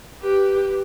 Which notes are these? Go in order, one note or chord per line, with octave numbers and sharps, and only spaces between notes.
G4 B4